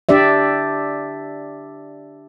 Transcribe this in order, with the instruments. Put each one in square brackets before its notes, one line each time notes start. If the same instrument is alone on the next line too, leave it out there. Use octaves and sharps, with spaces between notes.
[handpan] D4 G4 D5 E5